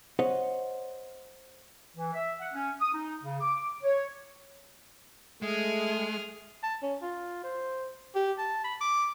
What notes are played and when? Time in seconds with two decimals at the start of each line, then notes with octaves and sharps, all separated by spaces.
0.19 C5 C#5 D#5 F#5
1.96 E3
2.13 E5
2.39 F#5
2.53 C#4
2.80 D#6
2.93 D#4
3.23 C#3
3.40 D6
3.83 C#5
5.42 G#3 A3 G#4 F6
6.63 A5
6.82 C#4
7.02 F4
7.44 C5
8.15 G4
8.38 A5
8.64 B5
8.81 D6